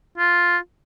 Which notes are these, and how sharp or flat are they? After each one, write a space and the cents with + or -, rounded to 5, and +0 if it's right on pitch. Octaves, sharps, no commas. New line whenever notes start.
F4 +0